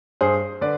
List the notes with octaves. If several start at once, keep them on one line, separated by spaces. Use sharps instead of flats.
G2 G#4 C5
D3 B4 D5